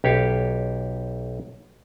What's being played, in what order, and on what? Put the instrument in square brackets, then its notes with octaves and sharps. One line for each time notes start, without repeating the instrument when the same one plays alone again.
[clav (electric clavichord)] B1 G4 C#5 F5